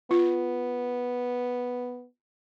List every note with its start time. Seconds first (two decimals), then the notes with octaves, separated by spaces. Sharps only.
0.11 B3 F4